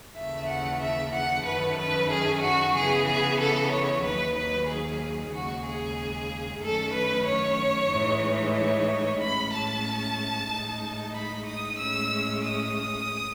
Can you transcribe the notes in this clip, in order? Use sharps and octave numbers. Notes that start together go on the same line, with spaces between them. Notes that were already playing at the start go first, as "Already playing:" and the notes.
D#2 C#3 E3 A3 E5
F#5
E5
F#5
F#2 D#3 F#3 A3 C#4 B4
B4
G#4
F#4
C#3 E3 B3 G#4
G#4
A4
C#5
D#2 D#3 F#3 B4
B4
G#4
D#2 C#3 G#3 F#4
G#4
F#2 D#3 A3 C#4 A4
B4
C#5
A2 E3 G#3 D#4
C#5
A2 G#3 C#4 B5
A5
A2 G#3 D#4
B5
D#6
A2 G#3 C#4 E6
D#6